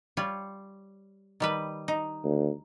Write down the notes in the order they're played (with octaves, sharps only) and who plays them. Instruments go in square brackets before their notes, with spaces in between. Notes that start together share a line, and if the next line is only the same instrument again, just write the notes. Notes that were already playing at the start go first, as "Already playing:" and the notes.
[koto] G3 F4 C#5
D#3 G3 B4
D#4
[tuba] D2